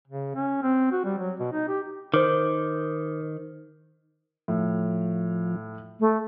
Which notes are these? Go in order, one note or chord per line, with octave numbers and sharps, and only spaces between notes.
C#3
C#4
C4
F#4
G3
F#3
B2
D#4
G4
D#3 C5 D6
A2 F3
A3